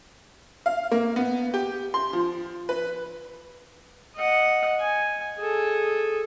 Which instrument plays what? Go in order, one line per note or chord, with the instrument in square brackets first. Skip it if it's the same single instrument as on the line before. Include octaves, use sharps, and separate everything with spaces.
[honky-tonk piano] F5
A#3
B3
G4
C6
F3
B4
[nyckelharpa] D#5 F#5
G#5
G#4 A4